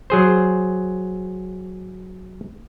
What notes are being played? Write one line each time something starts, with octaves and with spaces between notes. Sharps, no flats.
F#3 G#4 C5